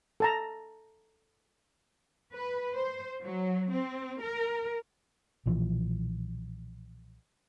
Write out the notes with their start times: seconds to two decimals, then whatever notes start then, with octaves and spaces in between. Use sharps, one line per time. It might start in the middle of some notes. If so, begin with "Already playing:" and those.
0.20 A4 A5 A#5
2.33 B4
2.73 C5
3.22 F#3
3.70 C4
4.20 A#4
5.46 B1 A#2 E3 F3